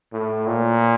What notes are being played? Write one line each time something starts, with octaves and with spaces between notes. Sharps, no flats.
A2
A#2